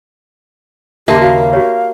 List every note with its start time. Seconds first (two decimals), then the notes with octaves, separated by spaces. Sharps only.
1.08 D#2 C#3 A#3 G4 E5 A5 C6
1.21 F#4 F5
1.53 F#4 G4 C#5